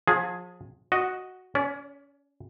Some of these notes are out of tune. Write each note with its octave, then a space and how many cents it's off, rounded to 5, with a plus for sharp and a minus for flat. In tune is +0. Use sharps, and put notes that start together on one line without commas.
F3 +35 G#4 +0
F#4 +0 D#5 +0
C#4 +25 D5 -25